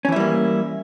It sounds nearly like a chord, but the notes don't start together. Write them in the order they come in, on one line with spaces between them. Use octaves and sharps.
C#4 E3 E4 G3 A#3